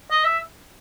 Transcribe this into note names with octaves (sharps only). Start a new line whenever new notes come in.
D#5
E5